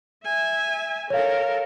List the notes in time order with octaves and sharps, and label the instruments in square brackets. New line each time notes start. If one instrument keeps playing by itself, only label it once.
[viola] E5 G#5
[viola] A4 A#4 [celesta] C#5 F5